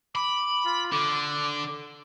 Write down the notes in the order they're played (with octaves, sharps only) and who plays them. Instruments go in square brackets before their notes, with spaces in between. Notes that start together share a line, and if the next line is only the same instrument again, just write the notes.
[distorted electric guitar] B5 [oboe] D6
[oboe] F4
[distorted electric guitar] D3 [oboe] D6